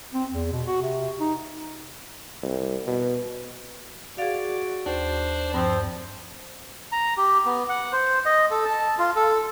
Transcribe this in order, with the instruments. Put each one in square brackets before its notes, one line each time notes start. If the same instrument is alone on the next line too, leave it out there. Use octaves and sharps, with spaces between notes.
[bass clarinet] C4
E2
B2
F#4
C3
D#4
[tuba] C2
B2
[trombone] F#4 [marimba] G#4 F5 [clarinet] D5
[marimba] D#2 [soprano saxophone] D4 [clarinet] C5
[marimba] G2 [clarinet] F3 [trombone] C4
[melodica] A#5
G4
B3
F#5
C5
D#5
A4
A5
F4
A4